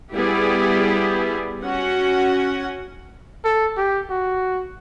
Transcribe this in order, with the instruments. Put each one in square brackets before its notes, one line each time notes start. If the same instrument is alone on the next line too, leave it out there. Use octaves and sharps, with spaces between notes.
[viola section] G3 B3 E4 G4 G#4
C#4 F#4 F#5
[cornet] A4
G4
F#4